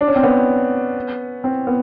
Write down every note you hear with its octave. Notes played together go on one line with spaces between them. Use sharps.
D4
C#4
C4
B3 C#4
C4
B3